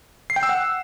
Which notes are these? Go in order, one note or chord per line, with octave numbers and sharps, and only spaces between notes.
C7
G5
E6
F#5